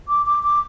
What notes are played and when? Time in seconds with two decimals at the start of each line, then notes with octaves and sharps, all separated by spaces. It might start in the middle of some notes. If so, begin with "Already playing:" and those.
0.08 D6
0.26 D6
0.43 D6